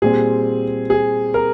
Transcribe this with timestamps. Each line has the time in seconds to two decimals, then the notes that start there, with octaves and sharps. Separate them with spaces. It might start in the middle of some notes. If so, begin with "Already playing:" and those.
0.02 A#2 G3 C4 G#4
0.90 G#4
1.34 A#4